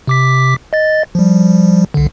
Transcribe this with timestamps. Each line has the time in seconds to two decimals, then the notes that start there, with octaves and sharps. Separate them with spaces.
0.07 C3 D6 B6
0.73 D#5 A6
1.15 F3 G3
1.94 C2 D3